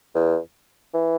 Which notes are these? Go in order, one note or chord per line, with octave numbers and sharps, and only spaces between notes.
E2
E3